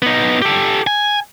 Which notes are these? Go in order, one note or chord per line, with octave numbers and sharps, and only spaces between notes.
B3 D#4
G4 A4
G#5